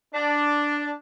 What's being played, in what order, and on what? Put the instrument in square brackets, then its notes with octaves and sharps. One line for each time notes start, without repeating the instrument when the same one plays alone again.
[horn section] D4